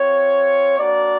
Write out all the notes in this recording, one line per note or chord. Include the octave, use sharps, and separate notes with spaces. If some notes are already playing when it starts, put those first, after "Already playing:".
Already playing: C4 F4 C#5
A#3 D4 F#4 D5